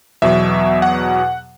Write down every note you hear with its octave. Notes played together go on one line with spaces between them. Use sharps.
E2 B2 F#3 E5
F#5